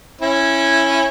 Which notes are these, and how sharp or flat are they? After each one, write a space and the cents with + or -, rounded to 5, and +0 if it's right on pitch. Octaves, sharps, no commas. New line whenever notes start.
C#4 -15 E4 +5